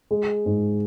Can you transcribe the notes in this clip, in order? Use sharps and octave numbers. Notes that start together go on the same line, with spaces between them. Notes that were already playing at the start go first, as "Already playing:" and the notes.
G#3
G#2